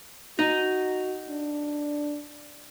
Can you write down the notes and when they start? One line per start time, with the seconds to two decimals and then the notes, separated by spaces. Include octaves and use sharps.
0.39 D#4 F#4
1.30 D4